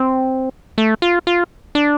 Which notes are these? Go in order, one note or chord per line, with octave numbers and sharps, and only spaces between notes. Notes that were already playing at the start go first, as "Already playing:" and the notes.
Already playing: C4
A3
F4
F4
D4